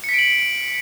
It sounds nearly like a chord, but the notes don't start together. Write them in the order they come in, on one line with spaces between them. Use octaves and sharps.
C#7 B6 D7 F#7